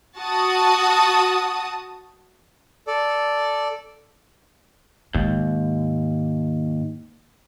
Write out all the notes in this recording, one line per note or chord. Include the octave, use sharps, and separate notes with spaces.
F#4 A5 D#6
A4 D5
D#2 G#2